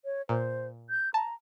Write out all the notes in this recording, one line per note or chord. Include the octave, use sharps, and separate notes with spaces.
C#5
A#2 C5
G6
A5 A#5